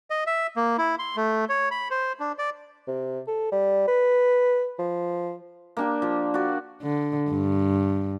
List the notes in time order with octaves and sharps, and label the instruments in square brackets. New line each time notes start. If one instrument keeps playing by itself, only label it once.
[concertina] D#5
E5
A#3
E4
C6
A3
C#5
B5
C5
D4
D5
[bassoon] C3
A4
G3
B4
F3
[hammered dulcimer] A#3 D4 G4
F3
F#4 D5
[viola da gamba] D3
G2